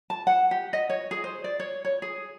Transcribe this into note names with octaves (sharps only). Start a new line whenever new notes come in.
A5
F#5
G4
D#5
C#5
G#4
C5
D5
C#5
C#5
G#4